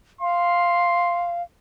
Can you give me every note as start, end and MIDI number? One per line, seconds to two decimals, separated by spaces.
0.21 1.42 77
0.21 1.34 84